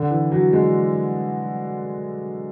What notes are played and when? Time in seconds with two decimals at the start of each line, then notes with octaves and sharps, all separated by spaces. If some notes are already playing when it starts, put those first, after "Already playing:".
Already playing: D3
0.11 E3
0.32 F#3
0.53 G#3